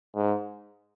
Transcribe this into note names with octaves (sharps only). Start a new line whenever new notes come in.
G#2